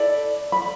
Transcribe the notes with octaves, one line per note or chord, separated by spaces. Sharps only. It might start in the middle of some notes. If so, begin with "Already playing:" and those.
Already playing: E4 A4 D5
B5